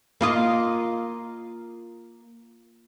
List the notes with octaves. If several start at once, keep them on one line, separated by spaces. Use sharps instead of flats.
A#3 F4 D#5